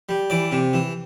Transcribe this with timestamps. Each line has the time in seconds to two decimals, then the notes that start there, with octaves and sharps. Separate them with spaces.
0.09 G3
0.30 E3 D5
0.52 C3
0.73 E3